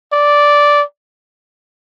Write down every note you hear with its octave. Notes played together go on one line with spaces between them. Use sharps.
D5